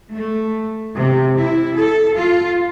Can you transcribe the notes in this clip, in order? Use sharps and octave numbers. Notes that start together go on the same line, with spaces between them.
A3
C3
E4
A4
F4